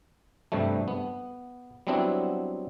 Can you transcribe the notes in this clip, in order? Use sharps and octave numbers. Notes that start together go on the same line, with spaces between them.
G2 C3 G3 A3
B3
F#3 G3 B3 C4 D4 E4